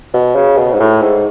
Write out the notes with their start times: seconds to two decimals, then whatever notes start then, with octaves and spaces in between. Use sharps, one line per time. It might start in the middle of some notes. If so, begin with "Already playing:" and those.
0.14 B2
0.35 C#3
0.58 B2
0.73 G#2
0.80 A2
1.02 G#2